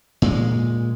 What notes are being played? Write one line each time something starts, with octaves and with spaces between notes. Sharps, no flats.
A#2 G#3